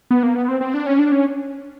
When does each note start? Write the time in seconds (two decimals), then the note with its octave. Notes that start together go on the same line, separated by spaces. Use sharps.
0.11 B3
0.23 A#3
0.36 B3
0.48 C4
0.61 C4
0.74 D4
0.86 C#4
0.99 D4
1.12 C#4